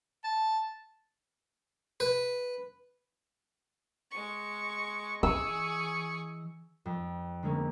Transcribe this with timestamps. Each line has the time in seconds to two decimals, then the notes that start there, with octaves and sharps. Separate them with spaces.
0.24 A5
2.00 B4
4.11 G#3 C#6
5.23 E3 G#4 C#6 E6
6.86 F2
7.43 D3 G#3 A#3 B3 C#4